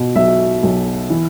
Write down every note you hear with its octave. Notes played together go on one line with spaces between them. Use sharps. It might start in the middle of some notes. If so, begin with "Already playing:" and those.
Already playing: B2
B1 E5
B1
E3